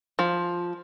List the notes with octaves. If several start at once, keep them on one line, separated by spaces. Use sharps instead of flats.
F3